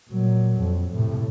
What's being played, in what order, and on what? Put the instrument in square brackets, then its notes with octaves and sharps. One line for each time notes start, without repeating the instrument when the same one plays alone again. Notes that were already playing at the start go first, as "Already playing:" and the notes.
[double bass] A#2 F#3
F2
A2 C3